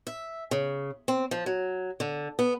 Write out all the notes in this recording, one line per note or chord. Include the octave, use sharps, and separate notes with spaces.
E5
C#3
C4
F3
F#3
D3
B3